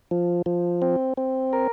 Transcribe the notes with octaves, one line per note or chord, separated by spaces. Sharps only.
F3
F3
C4
C4
A#4